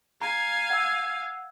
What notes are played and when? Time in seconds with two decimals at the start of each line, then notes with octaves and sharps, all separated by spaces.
0.22 F5 G#5 A#5
0.70 F#5 E6